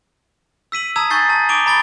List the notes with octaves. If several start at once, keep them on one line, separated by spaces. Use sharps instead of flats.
E6 B6 D#7 F#7
A5 A#5 D#6 E6 G#6
G#5 C#6 G6 A6 C7
A5
C#6 D6 D7 F7 G7
A#5 B5 A6 D7 G7